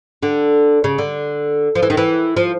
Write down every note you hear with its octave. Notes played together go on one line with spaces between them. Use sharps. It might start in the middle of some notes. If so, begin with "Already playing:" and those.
D3
C#3
D3
F3
E3
D#3
E3
F3